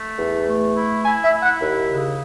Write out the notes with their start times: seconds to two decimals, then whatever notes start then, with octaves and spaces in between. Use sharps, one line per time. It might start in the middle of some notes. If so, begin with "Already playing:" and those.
Already playing: A3
0.18 E2
0.47 A3
0.75 E4
1.04 E4 G#5
1.22 E5
1.33 E4
1.41 F#5
1.61 D#2
1.89 C#3